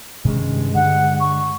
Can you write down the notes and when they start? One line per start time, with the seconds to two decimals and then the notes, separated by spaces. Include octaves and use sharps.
0.25 G2 C3 D#3 G#3 C#4
0.75 D3 F#5
1.20 C#6